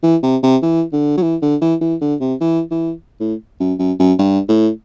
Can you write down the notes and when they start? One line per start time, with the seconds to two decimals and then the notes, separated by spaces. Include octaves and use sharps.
0.03 E3
0.23 C3
0.43 C3
0.62 E3
0.92 D3
1.17 F#3
1.22 E3
1.42 D3
1.61 E3
1.81 E3
2.01 D3
2.20 C3
2.40 E3
2.71 E3
3.20 A2
3.60 F#2
3.79 F#2
3.99 F#2
4.18 G2
4.48 A2